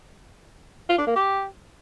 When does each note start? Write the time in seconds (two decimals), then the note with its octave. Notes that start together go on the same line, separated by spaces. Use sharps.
0.89 F4
0.98 D4
1.07 A#3
1.16 G4